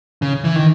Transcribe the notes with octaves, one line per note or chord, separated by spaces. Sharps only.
C#3
E3
D#3